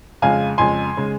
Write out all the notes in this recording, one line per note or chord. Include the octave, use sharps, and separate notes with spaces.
F2 C#3 G#3 F5 G#5
F2 C#3 G#3 G#5 C6
C#3 G#3